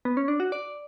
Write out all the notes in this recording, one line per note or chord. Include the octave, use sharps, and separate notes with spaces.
B3
C#4
D4
F#4
D5